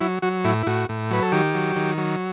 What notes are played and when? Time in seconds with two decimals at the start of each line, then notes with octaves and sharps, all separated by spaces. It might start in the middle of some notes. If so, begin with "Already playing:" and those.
0.01 F#3 E4
0.22 F#3 F#4
0.44 A2 E4
0.63 E4
0.66 A2 F#4
0.89 A2
1.11 F#3 B4
1.22 A4
1.32 D#3 G4
1.55 F#3
1.76 D#3
1.98 F#3